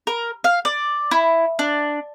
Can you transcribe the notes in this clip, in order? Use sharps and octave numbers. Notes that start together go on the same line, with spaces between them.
A#4
F5
D5
E4
D4